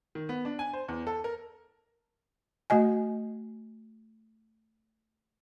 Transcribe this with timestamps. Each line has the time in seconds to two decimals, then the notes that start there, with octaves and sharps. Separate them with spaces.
0.15 D#3
0.29 B3
0.45 D4
0.59 G#5
0.73 C5
0.88 E2
1.07 A4
1.24 A#4
2.70 A3 F#4 D#5 G#5